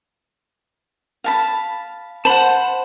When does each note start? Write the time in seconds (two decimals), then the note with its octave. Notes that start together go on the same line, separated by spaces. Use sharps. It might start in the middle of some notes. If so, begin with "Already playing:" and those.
1.24 F5 A5 B5
2.25 C5 F#5 A5 B5